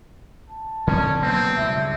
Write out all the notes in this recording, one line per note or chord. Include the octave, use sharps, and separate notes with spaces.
A5
D3 F3 C4 C#4
B2 F#3 A#3 C4
C#2 G2 E5